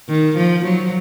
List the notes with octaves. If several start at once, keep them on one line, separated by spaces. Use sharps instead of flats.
D#3
F3
F#3